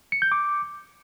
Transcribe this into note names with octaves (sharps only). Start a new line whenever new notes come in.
C#7
G6
D6